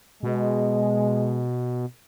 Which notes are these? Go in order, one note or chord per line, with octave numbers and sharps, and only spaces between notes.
B2 G#3